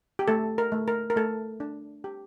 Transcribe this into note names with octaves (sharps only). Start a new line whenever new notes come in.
G4
A3 A4
A#4
A3
A#4
A#4
A3 A4
D4
G4